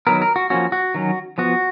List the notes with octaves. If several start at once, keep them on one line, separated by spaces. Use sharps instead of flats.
D#3 F#3 B3 A#4
A#4
F#4
F3 A#3 C#4 F#4
F#4
D#3 F#3 C#4
F3 B3 F#4